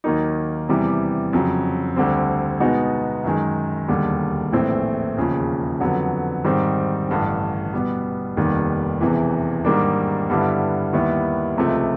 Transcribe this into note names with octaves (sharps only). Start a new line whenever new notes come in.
D#2 D#3 F#3 A#3 D#4
E2 C3 E3 G3
F2 C#3 F#3
D2 D3 G3 C4
B2 G#3 B3 D#4 F#4
F#2 D#3 G#3
E1 D#2 D3 G3
A#1 A2 E3 A3 C4
E1 D#2 C#3 F3
F2 D3 F#3 B3
G#2 D#3 G3 C4
A1 G2 D3
B2 G3 B3
F1 D#2 D#3 G3 B3
E1 E2 C3 E3
G#2 D#3 G3 A#3 D4
G2 D3 G3 B3 E4
D#2 D#3 G3 B3 E4
C#2 C3 F3 A3